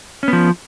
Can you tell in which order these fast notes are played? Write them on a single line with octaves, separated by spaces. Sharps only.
C#4 B3 F3